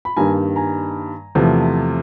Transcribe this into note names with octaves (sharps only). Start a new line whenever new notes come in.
B5
G2 D#3 G3 A#3 G#5 A#5
G#5 A#5
E2 C3 F3 A3